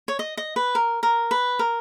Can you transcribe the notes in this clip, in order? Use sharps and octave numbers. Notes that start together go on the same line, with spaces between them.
C#5
D#5
D#5
B4
A#4
A#4
B4
A#4